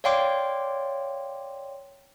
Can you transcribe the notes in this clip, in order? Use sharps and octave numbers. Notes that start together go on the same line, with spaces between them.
C#5 D5 F5 G5 C6 D6